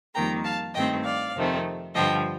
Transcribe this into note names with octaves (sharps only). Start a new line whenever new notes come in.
F2 D#3 G3 A#3 G5 A#5
F5 A5
G2 D#3 A3 C4 D#5 G5
D5 F5
F2 C3 D#3 A3 C4
G2 D3 F3 D#5 G5